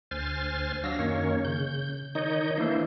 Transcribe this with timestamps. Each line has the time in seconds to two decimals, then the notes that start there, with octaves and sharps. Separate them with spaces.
0.11 D2 C5 G#5 F6 A6
0.84 F#3 D4 F5 E6 A#6
0.99 F#2 D#3 A#3 C#4 C#5
1.45 C#3 G6
2.15 D#3 D#4 C#5 D#5 G6
2.58 E3 A3 A#3 D4 E4 C5